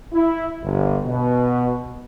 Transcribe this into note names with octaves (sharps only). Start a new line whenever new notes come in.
E4
G1
B2